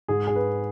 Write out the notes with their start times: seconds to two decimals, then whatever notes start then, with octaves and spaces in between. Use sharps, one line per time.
0.08 G#2 G#4
0.27 G#4
0.36 B4